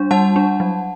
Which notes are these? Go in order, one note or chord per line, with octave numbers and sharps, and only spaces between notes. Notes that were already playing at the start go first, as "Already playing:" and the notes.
Already playing: G3 D4
G3 F#5 A5
D4
F#3